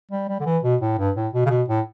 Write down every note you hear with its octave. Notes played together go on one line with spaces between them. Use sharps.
G3
G3
D3
E3
B2
A2
G2
A2
B2
C#3
B2
A2